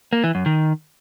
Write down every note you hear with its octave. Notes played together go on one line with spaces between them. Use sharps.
A#3
E3
F#2
D#3